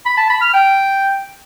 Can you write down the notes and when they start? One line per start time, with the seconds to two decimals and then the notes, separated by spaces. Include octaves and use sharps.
0.06 B5
0.18 A5
0.29 B5
0.41 F6
0.53 G5